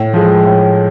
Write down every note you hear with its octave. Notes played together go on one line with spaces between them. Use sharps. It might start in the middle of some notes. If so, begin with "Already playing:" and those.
Already playing: A2
F3 G#3
A2